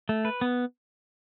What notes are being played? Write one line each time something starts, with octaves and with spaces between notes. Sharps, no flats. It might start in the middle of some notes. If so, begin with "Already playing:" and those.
A3
B4
B3